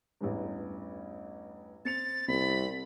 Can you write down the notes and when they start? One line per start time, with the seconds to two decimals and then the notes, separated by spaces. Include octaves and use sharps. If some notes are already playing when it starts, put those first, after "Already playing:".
0.21 A1 E2 G2
1.85 C4 A6 C#7 F7
2.28 C2 C4 B5